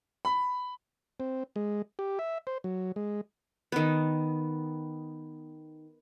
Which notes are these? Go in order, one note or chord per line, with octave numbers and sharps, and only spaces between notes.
B5
C4
G#3
G4
E5
C5
F#3
G#3
D#3 B3